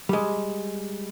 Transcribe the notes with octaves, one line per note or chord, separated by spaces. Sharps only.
G3 G#3